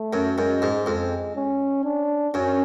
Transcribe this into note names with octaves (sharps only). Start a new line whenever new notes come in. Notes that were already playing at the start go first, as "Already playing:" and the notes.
Already playing: A3
F#2
F#2 G#3
G#2
F2 G#3
C#4
D4
F#2 C#4